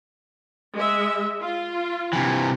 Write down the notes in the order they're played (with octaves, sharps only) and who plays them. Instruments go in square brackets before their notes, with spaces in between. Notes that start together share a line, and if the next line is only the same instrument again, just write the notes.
[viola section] G#3 E5
F4
[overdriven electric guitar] C3 E3